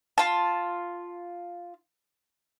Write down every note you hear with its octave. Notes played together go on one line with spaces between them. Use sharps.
F4 A5